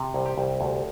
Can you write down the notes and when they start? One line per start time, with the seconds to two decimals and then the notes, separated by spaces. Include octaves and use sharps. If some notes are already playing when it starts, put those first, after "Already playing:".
Already playing: C3
0.14 C2
0.26 G4
0.38 C2
0.61 D2